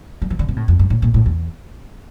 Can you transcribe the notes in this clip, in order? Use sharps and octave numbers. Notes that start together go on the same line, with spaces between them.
G3
E3
D3
C3
A2
F2
G2
A2
A#2
A2
E2